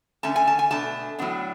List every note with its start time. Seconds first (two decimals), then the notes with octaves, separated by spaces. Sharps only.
0.23 D3 A3 C#4 A5
0.36 G#5
0.47 A5
0.59 G#5
0.71 B2 A3 D4 A5
1.19 A2 F#3 B3 D4